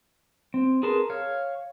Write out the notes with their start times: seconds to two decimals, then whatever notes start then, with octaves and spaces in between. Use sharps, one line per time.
0.54 C4
0.83 G#4 A#4 B4 A5 C6
1.10 C#5 F5